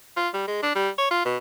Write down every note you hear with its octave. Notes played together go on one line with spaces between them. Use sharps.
F4
G3
G#3
D4
G3
C#5
F4
B2